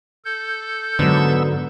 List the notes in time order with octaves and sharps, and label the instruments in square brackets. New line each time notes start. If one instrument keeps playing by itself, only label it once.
[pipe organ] A4 G6
[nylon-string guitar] G#2 F#3 [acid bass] D3 [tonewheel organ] B3 E6